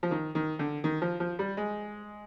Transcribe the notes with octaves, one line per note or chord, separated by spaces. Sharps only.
F3
D#3
D#3
D3
D#3
F3
F3
G3
G#3